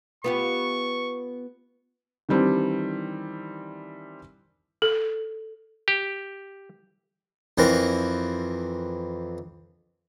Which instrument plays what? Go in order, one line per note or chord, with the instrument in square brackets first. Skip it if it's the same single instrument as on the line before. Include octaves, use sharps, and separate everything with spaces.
[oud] B3 F4 G4 [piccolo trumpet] C#6
[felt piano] D#3 E3 G3 C4 D4 E4
[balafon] A4
[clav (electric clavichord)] G4
[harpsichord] F2 E3 C4 A#4